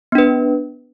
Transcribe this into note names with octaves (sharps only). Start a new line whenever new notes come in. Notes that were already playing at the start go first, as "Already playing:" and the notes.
B3 D4 B4